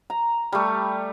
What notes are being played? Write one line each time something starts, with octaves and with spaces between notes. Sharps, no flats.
A#5
G3 A3